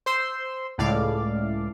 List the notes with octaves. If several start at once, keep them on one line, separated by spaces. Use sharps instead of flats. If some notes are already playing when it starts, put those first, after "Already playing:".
C5 C6 E6
C#2 A2 D5 F5